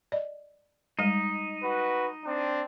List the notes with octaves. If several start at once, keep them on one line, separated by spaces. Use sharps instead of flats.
D5 D#5
G3 G#3 D#4 D#5
F#4 B4
C4 D4